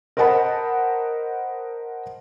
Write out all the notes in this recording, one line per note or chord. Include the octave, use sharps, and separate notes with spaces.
A#4 C5 D#5 F#5 A5 B5